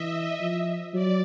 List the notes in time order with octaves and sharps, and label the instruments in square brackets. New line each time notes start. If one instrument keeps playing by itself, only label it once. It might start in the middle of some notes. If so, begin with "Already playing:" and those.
Already playing: [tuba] E3 [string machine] D#5 E5
[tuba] F3
[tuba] F#3 [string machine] D5